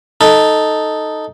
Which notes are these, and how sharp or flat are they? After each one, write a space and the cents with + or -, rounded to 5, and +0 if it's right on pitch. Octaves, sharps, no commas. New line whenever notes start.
D#4 +0 A4 +0